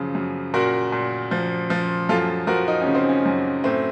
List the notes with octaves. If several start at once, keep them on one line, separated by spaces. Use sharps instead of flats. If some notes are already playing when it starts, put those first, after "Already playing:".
Already playing: F#2 C#3 F3
F#2
A#2 F#4 A#4
A#2
F3
F3
F#2 F4 A4
F3 F#4 A#4
D#4
C#4
C#3
C4
C#4
F#2
A2 C4